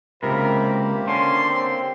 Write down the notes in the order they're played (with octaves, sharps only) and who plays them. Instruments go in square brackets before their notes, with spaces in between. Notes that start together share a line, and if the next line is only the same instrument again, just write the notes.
[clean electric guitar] C#2 C3 [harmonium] A#3 G4 C5 [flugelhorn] A#4 [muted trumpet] B5
[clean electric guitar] D3 [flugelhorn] C#4 [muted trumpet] C6
[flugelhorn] C4